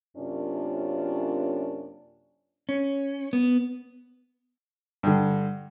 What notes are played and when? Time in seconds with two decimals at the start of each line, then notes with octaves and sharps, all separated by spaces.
0.17 F#2 C3 A#3 C#4 D4 F4
2.69 C#4
3.33 B3
5.03 G2 D3